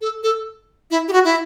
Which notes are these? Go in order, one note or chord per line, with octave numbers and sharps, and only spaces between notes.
A4
A4
E4
G4
F#4
E4